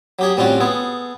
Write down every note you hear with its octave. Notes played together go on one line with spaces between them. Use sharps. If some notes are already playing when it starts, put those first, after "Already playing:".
F#3 G4 G#4
A2 G3 C4 C#4 F4 F#4
B3 G#4 A4